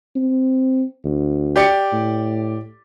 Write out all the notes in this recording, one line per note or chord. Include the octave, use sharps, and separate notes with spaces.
C4
D2
G4 D5 C#7
A2